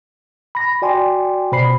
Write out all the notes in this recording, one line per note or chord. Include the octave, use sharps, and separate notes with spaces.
B5 A#6
F#4 D5 G5 G#5 C6
B2 C5 B5 C7